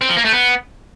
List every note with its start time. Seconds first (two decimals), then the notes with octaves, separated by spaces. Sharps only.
0.01 C4
0.09 F3
0.17 A#3
0.25 A3
0.33 B3